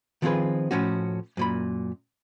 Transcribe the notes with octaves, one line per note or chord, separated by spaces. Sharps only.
D#3 F3 C4 F4 G#4 B4
A2 F3 C#4 F#4
F#2 A#2 B5